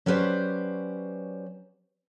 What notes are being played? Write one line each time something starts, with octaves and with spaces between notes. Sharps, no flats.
F#3 C#4 G4 B4 C5 D5